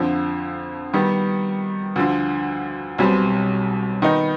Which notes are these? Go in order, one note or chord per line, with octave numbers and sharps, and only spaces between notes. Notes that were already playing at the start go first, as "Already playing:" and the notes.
Already playing: F2 D3 F3
D#3 G3 B3
D2 D3 F3
B1 B2 G3 C4
D#3 B3 D#4